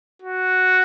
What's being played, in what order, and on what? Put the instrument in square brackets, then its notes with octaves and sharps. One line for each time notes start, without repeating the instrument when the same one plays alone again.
[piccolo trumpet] F#4